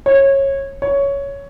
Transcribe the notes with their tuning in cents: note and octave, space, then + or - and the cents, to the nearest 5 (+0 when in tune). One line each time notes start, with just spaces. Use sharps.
C#5 -20
C#5 +10